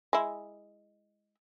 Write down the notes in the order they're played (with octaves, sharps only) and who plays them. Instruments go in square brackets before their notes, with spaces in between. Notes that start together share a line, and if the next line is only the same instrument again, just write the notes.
[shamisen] G#3 E4